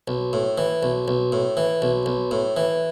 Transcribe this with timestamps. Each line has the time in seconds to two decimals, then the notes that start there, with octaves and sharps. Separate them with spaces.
0.08 B1
0.33 A2
0.58 E3
0.83 B1
1.08 B1
1.32 A2
1.57 E3
1.82 B1
2.06 B1
2.31 A2
2.57 E3